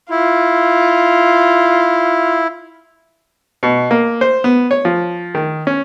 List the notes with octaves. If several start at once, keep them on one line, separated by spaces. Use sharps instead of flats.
E4 F4
B2
A#3
C5
B3
C#5
F3
D#3
C#4